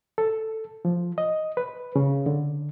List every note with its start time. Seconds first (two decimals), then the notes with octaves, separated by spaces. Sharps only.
0.18 A4
0.85 F3
1.18 D#5
1.57 B4
1.96 C#3
2.26 D3